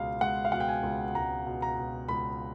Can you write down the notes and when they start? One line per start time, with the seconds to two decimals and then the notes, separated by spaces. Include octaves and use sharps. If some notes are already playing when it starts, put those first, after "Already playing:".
Already playing: C#2 B2 G#3 F5
0.21 G#3 F#5
0.45 F5
0.52 B2 F#5
0.60 G5
0.68 G#5
0.83 C#2
1.15 C#2 A#5
1.47 B2
1.62 A#5
1.77 B2
2.08 C#2 B5